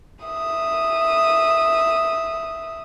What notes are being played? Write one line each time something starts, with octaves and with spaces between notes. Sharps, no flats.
E5 D#6